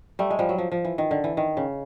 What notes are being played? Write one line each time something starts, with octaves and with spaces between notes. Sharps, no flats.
G3 A3
G#3
F3 G3
F#3
F3
F3
E3
D#3
D3
E3
D#3
C#3